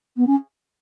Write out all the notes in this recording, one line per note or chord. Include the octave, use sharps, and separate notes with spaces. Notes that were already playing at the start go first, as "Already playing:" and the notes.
B3
C#4